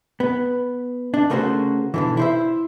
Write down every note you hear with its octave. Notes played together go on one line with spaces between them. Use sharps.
B3
D4
C#3 A3 A#3 C#4 F#4 C5
B2 D3 E3
E4 C5 E5